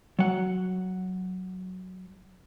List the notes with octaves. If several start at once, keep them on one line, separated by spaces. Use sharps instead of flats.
F#3 F#5